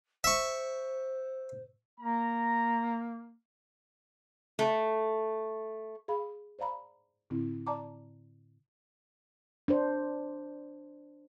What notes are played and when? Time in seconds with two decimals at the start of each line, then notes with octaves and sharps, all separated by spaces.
0.24 C5 E5 C#6
2.00 A#3 A#5
4.59 A3
6.08 G#4 F5 B5
6.59 C5 D5 F5 A#5 B5
7.30 A2 D3 C4 E4
7.67 D5 A5 A#5 D6
9.68 D4 C5